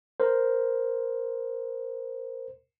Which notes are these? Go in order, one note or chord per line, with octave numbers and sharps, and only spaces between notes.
A#4 C5